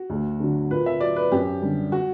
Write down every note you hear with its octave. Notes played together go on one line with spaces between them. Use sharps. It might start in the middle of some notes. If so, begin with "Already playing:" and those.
Already playing: F#4
D2
D3 F#3
A#2 B4
E5
F#3 D5
B4
F#2 G4
D3 G3
F#4